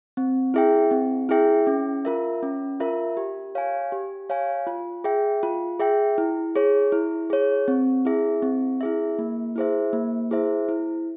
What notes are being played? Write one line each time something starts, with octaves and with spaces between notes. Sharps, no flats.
C4
E4 G#4 E5 G5
C4
E4 G#4 E5 G5
C#4
F4 A#4 E5
C#4
F4 A#4 E5
G4
C#5 F5 G#5
G4
C#5 F5 G#5
F4
G#4 E5 G5
F4
G#4 E5 G5
E4
G#4 C#5
E4
G#4 C#5
C4
E4 G#4 E5
C4
E4 G#4 E5
A#3
E4 G#4 C5 E5
A#3
E4 G#4 C5 E5
E4